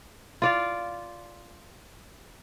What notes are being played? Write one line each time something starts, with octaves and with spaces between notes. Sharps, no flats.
F4 D5 F5